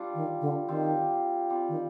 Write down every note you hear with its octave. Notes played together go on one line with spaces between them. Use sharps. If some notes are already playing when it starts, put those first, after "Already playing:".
Already playing: G3 D4 F4
D#3
D3
D#3 G3 C4 F4
G3 C4 F4
D#3